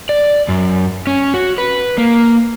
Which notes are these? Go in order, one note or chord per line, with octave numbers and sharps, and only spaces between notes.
D5
F#2
C#4
F#4
B4
A#3